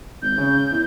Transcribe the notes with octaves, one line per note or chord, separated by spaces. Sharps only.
G#1 G6
C#3
E2